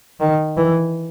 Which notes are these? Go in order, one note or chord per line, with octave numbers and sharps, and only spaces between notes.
D#3
E3